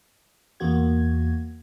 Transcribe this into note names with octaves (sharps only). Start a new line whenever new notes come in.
E2 A#3 F#4 G#6